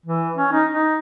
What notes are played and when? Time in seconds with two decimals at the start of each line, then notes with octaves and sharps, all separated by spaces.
0.06 E3
0.36 C#4
0.53 D#4
0.72 D#4